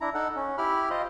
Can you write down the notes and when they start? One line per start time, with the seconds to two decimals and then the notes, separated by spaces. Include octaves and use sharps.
0.01 D4 E4 A#5
0.15 D#4 A4 F#5
0.36 C#4
0.58 E4 G4 B5 F6
0.91 F4 C5 D#5